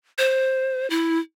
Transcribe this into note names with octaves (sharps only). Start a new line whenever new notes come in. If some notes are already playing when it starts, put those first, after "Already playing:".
C5
E4